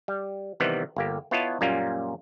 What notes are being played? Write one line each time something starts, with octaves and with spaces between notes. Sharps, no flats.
G3
C3 D#3 E3 G3 B3 C4
G1 A#3 G4
B3 E4 F4 C#5 D#5 A5
F#2 A#2 G3 A#3 C#4 F4